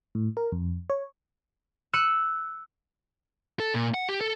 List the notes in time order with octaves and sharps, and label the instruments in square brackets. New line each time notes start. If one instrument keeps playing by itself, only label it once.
[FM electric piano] A2
A#4
F2
C#5
[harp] E6 F#6 C#7 D#7
[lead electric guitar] A4
A#2
F#5
G4
A4